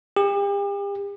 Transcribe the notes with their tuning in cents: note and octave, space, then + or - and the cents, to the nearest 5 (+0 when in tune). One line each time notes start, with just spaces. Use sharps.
G4 +40